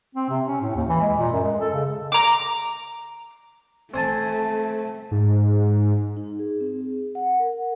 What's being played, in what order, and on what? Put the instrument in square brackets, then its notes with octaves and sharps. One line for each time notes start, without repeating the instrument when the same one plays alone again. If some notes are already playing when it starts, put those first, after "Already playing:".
[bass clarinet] C4
C3
C#4
A2
D#2
E3
G#3
A#2
F#2
G#3
A4
C#3
[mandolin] A#5 D6
[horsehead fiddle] A3 [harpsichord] C4 G#5 A5
[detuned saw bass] G#2
[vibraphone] D#4
G#4
C4
G#4
F#5
A#4